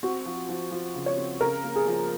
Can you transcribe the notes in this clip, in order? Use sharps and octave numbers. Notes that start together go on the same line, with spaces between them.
C4 F#4
F3
F3
F3
C#3
C#5
C4
C#3 A#4
A#3
G#4
F3